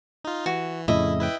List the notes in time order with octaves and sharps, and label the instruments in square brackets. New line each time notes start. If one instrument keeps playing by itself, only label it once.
[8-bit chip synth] D#4 F4
[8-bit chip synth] E3 [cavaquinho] F#4
[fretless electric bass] F2 A2 C#3 [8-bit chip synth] E4 [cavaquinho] D#5 E5
[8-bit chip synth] E4 B4 G5